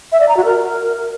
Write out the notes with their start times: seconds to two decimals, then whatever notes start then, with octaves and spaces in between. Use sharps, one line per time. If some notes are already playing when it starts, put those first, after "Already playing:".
0.12 E5
0.20 D5
0.29 A#5
0.37 F#4
0.45 A#4